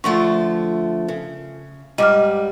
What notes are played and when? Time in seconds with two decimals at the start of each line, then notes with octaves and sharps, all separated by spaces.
0.04 D3 F3 A3 C#6
1.08 C#3
1.98 G#2 G3 D#5 D6 F6